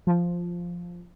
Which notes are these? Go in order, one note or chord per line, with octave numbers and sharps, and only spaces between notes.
F3